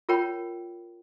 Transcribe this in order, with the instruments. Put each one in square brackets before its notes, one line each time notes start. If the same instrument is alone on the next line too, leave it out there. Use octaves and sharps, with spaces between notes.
[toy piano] F4 A#4 C#5 G5 B5